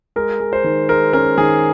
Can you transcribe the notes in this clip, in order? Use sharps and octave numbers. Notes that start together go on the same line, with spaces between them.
G#3 A#4
G#3
C5
D#3
G#3 A#4
C#4 A#4
D#3 G#4